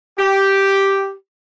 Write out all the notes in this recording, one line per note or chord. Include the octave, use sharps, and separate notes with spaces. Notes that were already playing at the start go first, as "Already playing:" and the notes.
G4